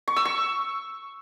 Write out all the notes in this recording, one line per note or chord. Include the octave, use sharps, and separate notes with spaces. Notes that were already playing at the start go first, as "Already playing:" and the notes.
C#6
E6
C#6